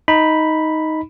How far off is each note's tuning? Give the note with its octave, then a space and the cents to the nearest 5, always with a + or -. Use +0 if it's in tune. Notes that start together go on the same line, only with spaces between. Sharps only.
D#4 +10 B5 +0